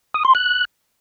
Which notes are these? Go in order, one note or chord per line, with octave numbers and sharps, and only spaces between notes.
D#6
C6
F#6